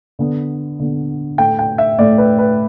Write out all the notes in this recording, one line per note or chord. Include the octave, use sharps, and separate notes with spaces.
D3 B3
D3 B3
A2 A3 G5
G5
E5
A2 A3 D5
B4
B4